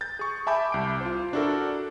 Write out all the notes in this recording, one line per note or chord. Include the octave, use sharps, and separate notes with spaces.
G6 A6
G#4 C#6
E5 G#5 A5 B5 D6 G6
C2 D7
F4 C5
D4 E4 F#4 A4 A#4